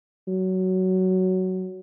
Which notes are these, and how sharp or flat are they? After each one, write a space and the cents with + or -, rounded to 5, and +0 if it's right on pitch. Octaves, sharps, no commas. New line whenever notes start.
F#3 +10